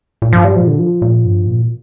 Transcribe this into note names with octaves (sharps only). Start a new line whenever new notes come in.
A#2
G2 F3
G3
A#2 F3
D3
F3
A#2
G2
A#2